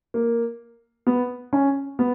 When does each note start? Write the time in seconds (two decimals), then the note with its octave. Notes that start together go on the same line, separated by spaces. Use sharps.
0.14 A#3
1.07 B3
1.53 C#4
1.99 B3